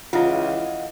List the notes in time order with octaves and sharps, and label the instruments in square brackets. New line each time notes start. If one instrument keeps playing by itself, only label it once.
[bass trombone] C#2 [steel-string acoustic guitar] E3 [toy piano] E4 F4 [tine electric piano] D#5 F5 F#5